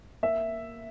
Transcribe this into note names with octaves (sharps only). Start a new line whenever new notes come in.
A#3 E5